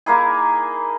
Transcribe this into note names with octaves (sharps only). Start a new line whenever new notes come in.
A#3 D#4 E4 G#4